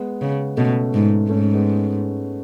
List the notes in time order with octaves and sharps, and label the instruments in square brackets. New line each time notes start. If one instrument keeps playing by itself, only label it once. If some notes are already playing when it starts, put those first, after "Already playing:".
Already playing: [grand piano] G#3 B3
[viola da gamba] C#3
[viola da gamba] B2 [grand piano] A3 C#4
[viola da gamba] G#2
[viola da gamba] G#2 [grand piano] A3 C#4
[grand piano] C#4
G#3 B3